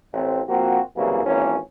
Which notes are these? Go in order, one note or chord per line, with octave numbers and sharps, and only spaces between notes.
A1 C4
F3 A#3 C4 F#4
C2 F#2 C#3 E3 A#3
G#1 E3 A#3 C#4